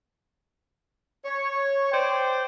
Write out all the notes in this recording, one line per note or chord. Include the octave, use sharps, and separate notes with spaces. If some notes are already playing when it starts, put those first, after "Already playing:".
C#5
C5 D5 G5 C6